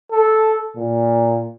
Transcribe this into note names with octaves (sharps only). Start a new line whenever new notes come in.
A4
A#2